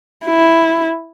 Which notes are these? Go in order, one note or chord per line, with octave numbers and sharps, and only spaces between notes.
E4